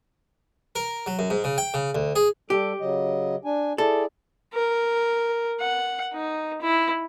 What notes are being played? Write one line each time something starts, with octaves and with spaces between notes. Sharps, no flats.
A#4
F#3
F#2
G#2
C#3
G5
C#3
D2
G#4
G3 G4 A4
C#3 F#3 D#5
D4 G#5
E4 G#4 A4 D5
A#4
F#5
D#4
E4